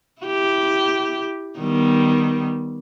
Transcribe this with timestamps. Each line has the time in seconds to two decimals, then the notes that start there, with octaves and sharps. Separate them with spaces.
0.22 E4 G4
1.59 D#3 G3 B3